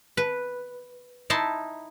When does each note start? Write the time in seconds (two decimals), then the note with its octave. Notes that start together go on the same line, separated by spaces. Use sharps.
0.17 B4
1.30 D#4 E4 A5 C6